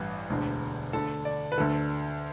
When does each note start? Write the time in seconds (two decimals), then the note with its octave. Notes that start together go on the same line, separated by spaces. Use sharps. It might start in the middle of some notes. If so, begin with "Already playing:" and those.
Already playing: A1 G2 E3 B4
0.30 E1 D2 D3
0.93 D2 D3 A4
1.25 D5
1.52 B4
1.58 D2 D3 A4